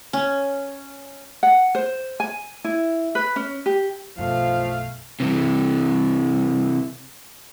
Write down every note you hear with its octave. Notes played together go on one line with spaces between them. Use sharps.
C#4
F#5
C5
G#5
E4
B4
C#4
G4
B1 F#2 F3 A3 F5
C3 E3